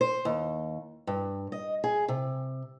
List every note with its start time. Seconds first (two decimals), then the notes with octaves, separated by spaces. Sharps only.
0.01 C5
0.25 D#2
1.07 G2
1.52 D#5
1.84 G#4
2.08 C3